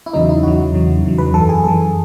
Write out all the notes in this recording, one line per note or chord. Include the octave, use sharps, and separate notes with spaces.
E4
E2 C#3 F#3 D#4
E4
E2 C#3 F#3 F#4
E2 C#3 F#3
E2 C#3 F#3
B4
F#2 E3 A4
G#4
F#2 E3 A4